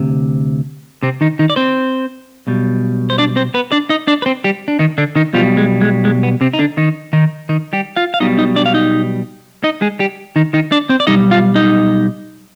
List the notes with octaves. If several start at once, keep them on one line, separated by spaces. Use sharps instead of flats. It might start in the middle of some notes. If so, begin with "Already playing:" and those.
Already playing: D2 C3
C3 C4
D#3 D#4
D#3 D#4
D5
C4 C5
B1 B2 G3
C5
D4 D5
C4 C5
B3 B4
D4 D5
D#4 D#5
D4 D5
B4
C4 C5
G3 G4
D4
D#3 D#4
D3 D4
D#3 D#4
B1 B2 F3 G3 F4
G#3
G#3
G#3
B3
C3 C4
D#4
D3 D4
D#3 D#4
D#3 D#4
D#3 D#4
G3 G4
F4 F5
F5
B1 B2 G3 D#4 D#5
D#4 D#5
D4 D5
F5
D#4 D#5
D#4 D#5
G#3 G#4
G3 G4
D#3 D#4
D#3 D#4
D4 D5
C4 C5
D5
B1 B2 G3 D#4 D#5
F4 F5
D#4 D#5